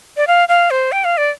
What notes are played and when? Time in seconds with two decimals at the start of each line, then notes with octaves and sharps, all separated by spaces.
0.17 D5
0.27 F5
0.49 F5
0.71 C5
0.92 G5
1.04 F5
1.17 D5